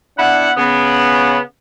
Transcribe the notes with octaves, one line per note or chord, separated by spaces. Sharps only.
B3 D4 E4 F#5
C#3 B3